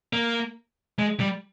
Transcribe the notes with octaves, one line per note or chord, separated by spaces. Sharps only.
A#3
G#3
G3